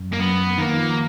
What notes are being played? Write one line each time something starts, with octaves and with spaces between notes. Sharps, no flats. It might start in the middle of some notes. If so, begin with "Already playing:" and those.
Already playing: F#2
A#3
F#2 B3
D#3 A#3
F3